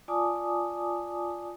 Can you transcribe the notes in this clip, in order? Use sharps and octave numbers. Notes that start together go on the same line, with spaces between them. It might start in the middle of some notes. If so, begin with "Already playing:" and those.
F4 D5 G#5 A5 D6 D#6